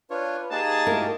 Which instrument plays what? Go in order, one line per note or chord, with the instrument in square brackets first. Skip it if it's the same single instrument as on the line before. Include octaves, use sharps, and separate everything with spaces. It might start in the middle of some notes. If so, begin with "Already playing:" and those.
[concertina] D4 F4 C#5 [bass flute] B4
[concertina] A#3 D#4 G4 [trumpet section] G#4 A5
[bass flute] A3 [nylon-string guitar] E4 F#4 A#4